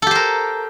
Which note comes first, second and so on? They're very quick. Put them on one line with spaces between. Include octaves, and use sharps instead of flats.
A4 G4 C5 A#4